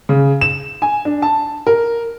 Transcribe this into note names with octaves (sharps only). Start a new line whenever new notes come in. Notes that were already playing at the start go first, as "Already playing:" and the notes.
C#3
E7
G#5
D4
A5
A#4